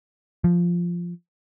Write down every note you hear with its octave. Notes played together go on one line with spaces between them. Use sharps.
F3